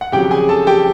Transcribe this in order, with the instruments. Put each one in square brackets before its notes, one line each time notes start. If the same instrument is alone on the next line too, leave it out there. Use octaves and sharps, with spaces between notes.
[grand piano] F#5
F2 C#3 F#3 G4 G5
G#4 G#5
A4 A5
G4 G5